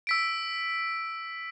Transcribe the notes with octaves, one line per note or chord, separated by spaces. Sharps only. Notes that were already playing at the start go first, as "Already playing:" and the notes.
E6 B6 D7